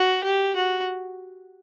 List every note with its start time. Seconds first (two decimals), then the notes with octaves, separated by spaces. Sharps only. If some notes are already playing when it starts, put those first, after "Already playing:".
Already playing: F#4
0.23 G4
0.56 F#4